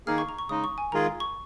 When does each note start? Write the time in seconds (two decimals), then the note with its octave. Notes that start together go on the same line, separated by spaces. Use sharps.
0.07 D#3 A#3 D#4 G#4 F6
0.18 C#6
0.29 A#5
0.39 C#6
0.49 C#3 G#3 D#4 D#6
0.64 C#6
0.78 G#5
0.92 D#3 G#3 F4 G#4 A#5
1.20 C#6